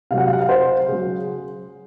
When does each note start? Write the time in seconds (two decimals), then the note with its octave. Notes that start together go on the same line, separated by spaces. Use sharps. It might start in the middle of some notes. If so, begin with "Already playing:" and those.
0.11 C3 F5
0.14 F#3 F#5
0.26 F5
0.33 F#5
0.41 F5
0.49 C5
0.88 C#3 F#3 G#4